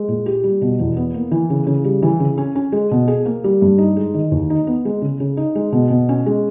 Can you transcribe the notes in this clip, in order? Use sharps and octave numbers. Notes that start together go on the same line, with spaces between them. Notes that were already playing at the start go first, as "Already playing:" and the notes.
Already playing: G#3
A#2
G4
G3
B2
E2
B3
A#3
E3
C#3
C#3
G3
E3
C#3
C#4
C#4
G#3
B2
G#4
A#3
G3
G2
D#4
G#3
D#3
D#2
D#4
B3
G#3
C#3
C#3
D#4
G#3
B2
B2
C#4
G#3